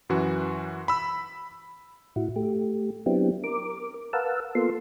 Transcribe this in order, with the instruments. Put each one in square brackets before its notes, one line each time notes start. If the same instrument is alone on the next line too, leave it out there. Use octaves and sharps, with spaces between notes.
[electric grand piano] F#2 E3 F#4
B5 E6
[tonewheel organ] A2 E4 F#4
A3 G4
F#3 B3 C4 D4 E4 G4
A#4 D6
A#4 B4 F5 F#5 A5 E6
A#3 B3 F4 A4 C6